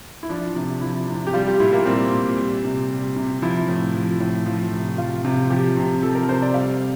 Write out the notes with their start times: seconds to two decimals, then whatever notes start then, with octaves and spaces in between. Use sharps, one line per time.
0.23 E4
0.29 F3 D4
0.55 C3
0.81 F3 E4
1.08 C3
1.27 G4
1.33 G3 F4
1.47 G4
1.60 A#2 E4
1.73 A#3
1.86 G3 C4
2.12 A#2
2.38 G3
2.65 C3
2.90 G3
3.16 C3
3.42 F3 E4
3.68 A2
3.95 F3
4.20 A2
4.46 F3
4.72 C3
4.98 F3 F4
5.25 C3
5.50 F3 G4
5.77 C3
6.02 F3 A4
6.15 A#4
6.29 C3 C5
6.42 D5
6.54 G3 F5